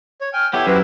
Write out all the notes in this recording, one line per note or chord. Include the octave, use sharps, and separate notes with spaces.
C#5
G5 G#5 F6
B3 E4 G4 A4 C#5
F#2 F#4 G4 B4 C5